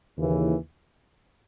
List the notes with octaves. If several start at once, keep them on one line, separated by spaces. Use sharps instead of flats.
D#2 C#3 E3